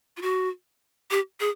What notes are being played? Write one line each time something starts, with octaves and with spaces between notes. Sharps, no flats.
F4
F#4
G4
G#4